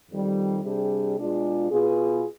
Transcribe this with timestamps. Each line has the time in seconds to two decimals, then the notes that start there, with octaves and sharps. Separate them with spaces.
0.10 F2 D#3 G3
0.63 C3 G3 D4 G#4
1.17 B2 G#3 D4 F4 G#4
1.70 B2 B3 F4 G#4